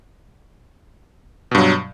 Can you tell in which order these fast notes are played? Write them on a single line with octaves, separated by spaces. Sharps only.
B2 G2 F#3